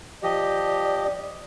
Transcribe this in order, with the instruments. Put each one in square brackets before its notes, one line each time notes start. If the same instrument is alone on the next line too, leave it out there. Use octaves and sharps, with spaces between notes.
[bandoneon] F3 G4 D#5 [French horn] D5